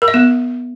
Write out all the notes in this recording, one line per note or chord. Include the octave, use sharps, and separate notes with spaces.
A#4
E5
B3